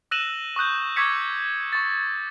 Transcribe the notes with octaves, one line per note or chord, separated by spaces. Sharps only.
E6 F#6 A#6 D#7 E7 F#7
C#6 D#6 F#6 G6
C#6 D6 E6 G#6 B6 C#7
C#6 A6